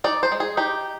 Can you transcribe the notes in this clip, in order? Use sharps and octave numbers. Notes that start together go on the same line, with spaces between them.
D#4 D5
C5
G#3
G#4
D#4 G4